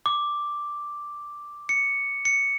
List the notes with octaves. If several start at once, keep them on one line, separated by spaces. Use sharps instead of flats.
D6
C#7
C#7